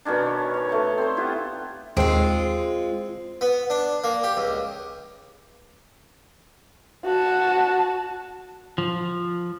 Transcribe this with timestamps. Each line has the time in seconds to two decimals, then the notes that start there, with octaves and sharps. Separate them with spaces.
0.05 B2 D#3 C#4 D4
0.26 C#5
0.54 C#5 D5
0.69 A3 B3 C#6
0.98 C4 C5
1.17 B3 E4 F4 G4
1.97 D#2 G#3 C4 F4
3.41 B3
3.70 D4
4.04 A#3
4.23 G4
4.37 C#2
7.05 F#4 A5
8.78 F3